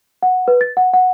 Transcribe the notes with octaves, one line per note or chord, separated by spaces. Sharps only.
F#5
B4
A6
F#5
F#5